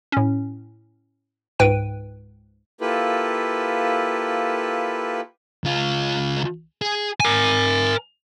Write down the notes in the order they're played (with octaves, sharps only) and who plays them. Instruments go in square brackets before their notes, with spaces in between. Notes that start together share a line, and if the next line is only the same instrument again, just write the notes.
[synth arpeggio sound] A2 C#4
C#2 G#2 B4 G5 D7 D#7
[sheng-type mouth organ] A#3 E4 F4 G4 A4 B4
[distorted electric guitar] C#2 F4
G#4
A#4 G#5